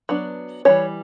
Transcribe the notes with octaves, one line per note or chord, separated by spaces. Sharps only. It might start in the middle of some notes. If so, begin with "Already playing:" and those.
F#3 B3 D4
E3 G3 C#4 C#5